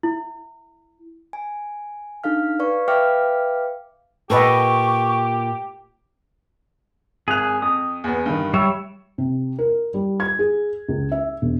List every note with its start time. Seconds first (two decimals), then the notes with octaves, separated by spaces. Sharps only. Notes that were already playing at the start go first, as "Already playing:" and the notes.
0.03 E4
1.33 G#5
2.24 D4 D#4 A4 F5 F6
2.59 B4 D5 F5 C#6
2.88 B4 E5 F5 G5 D6 F6
4.30 A#2 G4 A4 B4 D#5 C#6
7.28 G#1 G#4 F#6 F7
7.62 F2 D#6
8.04 E2 B3
8.26 G2 D#3
8.54 G3 C#5 E5 E6
9.18 C3
9.59 A#4
9.94 G3
10.20 G#6
10.39 G#4
10.88 C#2
11.12 E5
11.42 E1